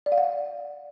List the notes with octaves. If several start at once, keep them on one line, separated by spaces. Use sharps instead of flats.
D5
F5
F#5